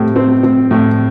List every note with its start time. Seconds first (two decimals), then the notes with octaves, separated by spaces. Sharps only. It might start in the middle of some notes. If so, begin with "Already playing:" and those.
Already playing: A2 G3 C4
0.16 C4
0.43 C4
0.71 A2